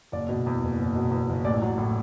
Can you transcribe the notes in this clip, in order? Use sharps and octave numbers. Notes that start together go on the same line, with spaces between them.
F#1 D5
B2
E2
F#1
F#1
B2
E2
F#1
A1 D5
F#3
A2